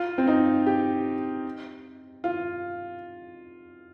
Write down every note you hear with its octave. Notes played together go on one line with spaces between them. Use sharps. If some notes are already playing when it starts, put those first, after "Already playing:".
Already playing: F4
C4
D#4
G4
F4